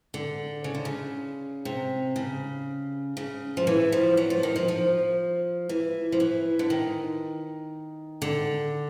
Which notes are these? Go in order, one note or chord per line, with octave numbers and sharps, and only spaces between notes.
D3
C#3
D3
C#3
C3
C#3
C#3
F3
E3
F3
F#3
F3
D#3
F3
F3
E3
F3
E3
D3
D#3
D3